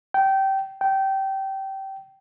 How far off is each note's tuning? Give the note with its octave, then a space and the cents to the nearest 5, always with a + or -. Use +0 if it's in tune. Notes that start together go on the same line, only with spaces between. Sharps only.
G5 -20
G5 -20